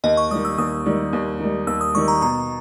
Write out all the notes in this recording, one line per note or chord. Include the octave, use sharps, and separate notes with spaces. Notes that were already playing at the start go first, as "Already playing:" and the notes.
D#2 D#5
C#6
D#3 G3 D#6
E6
D#2 D#6
D#3 G3
D#2
D#3 G3
D#2 E6
D#6
D#3 G3 C#6
A#5
B2 A#5